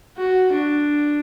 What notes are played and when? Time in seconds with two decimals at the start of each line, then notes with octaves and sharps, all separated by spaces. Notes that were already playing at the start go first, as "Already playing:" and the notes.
0.18 F#4
0.54 D4